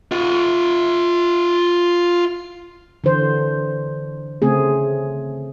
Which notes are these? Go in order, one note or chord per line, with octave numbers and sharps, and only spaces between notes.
F4 F#5
D3 E3 C5
C#3 A3 C4 G#4